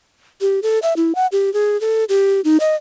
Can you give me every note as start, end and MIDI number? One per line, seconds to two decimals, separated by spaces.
0.41 0.60 67
0.63 0.79 69
0.82 0.94 76
0.96 1.15 64
1.15 1.27 78
1.32 1.52 67
1.54 1.79 68
1.81 2.04 69
2.09 2.41 67
2.44 2.58 63
2.60 2.75 75